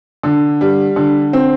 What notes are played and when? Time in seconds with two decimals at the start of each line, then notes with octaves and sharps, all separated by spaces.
0.23 D3
0.61 G3
0.96 D3
1.33 C4